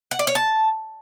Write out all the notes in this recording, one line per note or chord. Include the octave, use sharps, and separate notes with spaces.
F#5
D5
C#5
A5